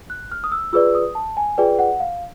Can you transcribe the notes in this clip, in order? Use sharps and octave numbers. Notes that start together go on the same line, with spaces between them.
F#6
F6
D#6
E6
F4 G#4 B4 D5 E6
D#6
A5
G#5
F4 G#4 B4 D5 G5
F#5
F5